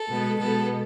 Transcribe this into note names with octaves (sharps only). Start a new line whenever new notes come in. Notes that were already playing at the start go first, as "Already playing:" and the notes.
Already playing: A4
B2 G#3 B3
B2 G#3 B3 A4